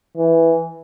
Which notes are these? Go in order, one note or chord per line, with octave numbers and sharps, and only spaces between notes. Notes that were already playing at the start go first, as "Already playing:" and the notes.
E3